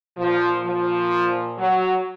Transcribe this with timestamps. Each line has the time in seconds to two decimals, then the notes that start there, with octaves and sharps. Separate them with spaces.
0.17 A#2 F3
0.65 F3
1.58 F#3